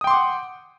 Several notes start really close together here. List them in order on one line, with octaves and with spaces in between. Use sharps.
D#6 G5 C6 D6 F#5